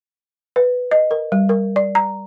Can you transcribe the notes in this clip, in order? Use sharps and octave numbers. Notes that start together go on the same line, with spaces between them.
B4
D#5
A#4
G3
A#4
D5
A#5